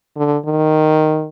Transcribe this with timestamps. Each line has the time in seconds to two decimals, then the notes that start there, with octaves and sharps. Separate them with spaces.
0.16 D3
0.45 D#3